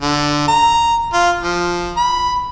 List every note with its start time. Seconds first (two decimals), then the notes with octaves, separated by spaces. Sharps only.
0.02 D3
0.48 A#5
1.13 F4
1.41 F3
1.97 B5